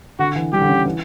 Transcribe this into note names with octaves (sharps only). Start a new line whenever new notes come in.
D3 F#4
E3
G3 G4
D3
C#3
D3
E3